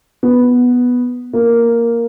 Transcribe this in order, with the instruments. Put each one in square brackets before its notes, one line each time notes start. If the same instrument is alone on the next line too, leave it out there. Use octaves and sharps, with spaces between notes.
[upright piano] B3
A#3